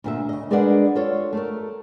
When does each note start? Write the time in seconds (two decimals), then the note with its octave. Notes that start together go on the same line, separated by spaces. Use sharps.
0.04 D2 A#2 E5
0.29 C#3 D#5
0.51 G#3 D4 A#4 B4 D5 F#5
0.95 F4 A4 C#5
1.33 A3 A4 A#4